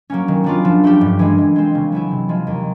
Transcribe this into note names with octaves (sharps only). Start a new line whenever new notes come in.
F#3 A#3 C#4
D#3
F#3 B3 D4 F4
F3
A3 D4 G4
G2
E3 G#3
E3
G#3 C4
C#3
F#3 B3 E4
C3
F3 G#3
D#2